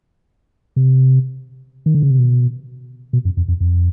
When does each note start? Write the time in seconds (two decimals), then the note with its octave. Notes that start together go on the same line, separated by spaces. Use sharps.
0.76 C3
1.86 D#3
1.94 D3
2.02 C#3
2.10 C3
2.19 B2
3.13 B2
3.25 F#2
3.37 F2
3.48 F2
3.60 F2